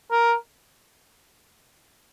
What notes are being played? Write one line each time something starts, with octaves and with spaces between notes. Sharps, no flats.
A#4